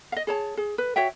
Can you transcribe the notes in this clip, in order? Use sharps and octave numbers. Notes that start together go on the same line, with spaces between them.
D#5 F5
G#4 C#5 A5
G#4
B4
F#4 C#5 E5 G5